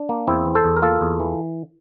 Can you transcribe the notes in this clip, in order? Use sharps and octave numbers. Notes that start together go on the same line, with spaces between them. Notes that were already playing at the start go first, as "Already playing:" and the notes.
Already playing: D4
A#3
E2 C4 E4
E3
A4 C5
E2
A#4
A#3 F4 A4
E2
E3